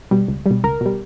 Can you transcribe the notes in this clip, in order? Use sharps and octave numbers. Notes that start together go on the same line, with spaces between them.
B2 G3
C#2
B2 G3
C#2 A#4
B2 G3